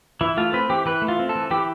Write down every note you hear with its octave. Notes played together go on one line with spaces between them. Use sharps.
E3 E4
A3 F4
C4 B4
E3 G4
E3 B4
A3
F4
C4
A4
E3
E3 G4